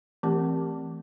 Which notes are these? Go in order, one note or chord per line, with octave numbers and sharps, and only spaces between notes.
E3 A3 C4 G4 A#4